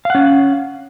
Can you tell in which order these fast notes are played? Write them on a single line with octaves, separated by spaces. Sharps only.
F5 F#5 C#4